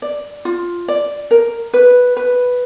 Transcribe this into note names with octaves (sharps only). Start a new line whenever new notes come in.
D5
F4
D5
A#4
B4
B4